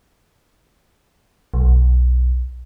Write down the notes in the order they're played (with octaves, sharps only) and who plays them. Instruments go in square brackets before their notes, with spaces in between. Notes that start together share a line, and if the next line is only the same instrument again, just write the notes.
[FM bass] B1